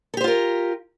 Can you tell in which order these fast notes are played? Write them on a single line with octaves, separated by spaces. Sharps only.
A4 G4 C5 F4 A#4